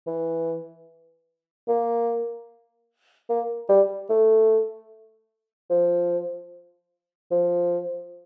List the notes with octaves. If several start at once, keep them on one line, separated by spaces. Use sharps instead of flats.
E3
A#3
A#3
G3
A3
F3
F3